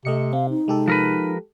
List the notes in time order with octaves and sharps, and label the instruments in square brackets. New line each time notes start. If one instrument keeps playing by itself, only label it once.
[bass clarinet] C3 [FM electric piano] A3 D#5 C#7
[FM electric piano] C4 [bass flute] F5
[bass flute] D#4
[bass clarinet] C3 [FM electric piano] G#3 G4 A4
[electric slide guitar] F3 A#4 B4